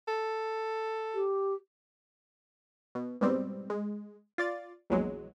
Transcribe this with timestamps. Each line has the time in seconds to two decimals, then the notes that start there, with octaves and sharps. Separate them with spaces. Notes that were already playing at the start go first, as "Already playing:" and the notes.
0.08 A4
1.14 G4
2.95 B2
3.21 G#2 B2 G3 C4
3.70 G#3
4.38 F4 D5 A6
4.90 A#1 E2 F#3 G#3